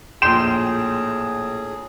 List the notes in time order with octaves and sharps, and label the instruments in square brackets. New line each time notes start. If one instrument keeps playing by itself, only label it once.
[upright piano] A#1 E7 [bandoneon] A2 G#4 [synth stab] G5 C6